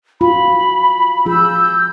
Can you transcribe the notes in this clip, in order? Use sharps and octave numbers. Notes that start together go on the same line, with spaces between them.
F4 F#4 B5
F3 F4 G#4 E6 G6